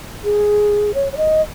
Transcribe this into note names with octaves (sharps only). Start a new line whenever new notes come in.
G#4
C#5
C#5
D#5